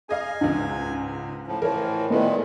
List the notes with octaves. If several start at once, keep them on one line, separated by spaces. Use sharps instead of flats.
G#4 D#5 F5 G#5
C#2 G#2
A2 F3
A2 E3 F3 A#4 C#5
A#2 D#3 G#3 A3 B3 E4